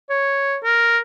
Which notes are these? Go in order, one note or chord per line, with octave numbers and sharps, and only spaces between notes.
C#5
A#4